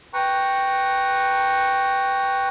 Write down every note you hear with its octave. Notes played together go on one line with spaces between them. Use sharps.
B4 G5 A#5 C#6